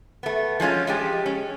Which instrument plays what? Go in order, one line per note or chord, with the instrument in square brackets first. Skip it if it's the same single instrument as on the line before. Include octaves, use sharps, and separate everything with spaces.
[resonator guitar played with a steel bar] A3 B3
F3 G#3 C#4 F4
F3 G#3 G4
C#4